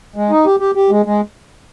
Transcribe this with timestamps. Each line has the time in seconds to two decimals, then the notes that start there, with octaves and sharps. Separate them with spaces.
0.16 G#3
0.30 D#4
0.46 G4
0.60 G4
0.75 G4
0.90 G#3
1.06 G#3